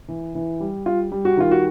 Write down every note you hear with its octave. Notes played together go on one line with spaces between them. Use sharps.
E3
E3
G3
G3 F4
G3
F#4
D#3 F4
F#4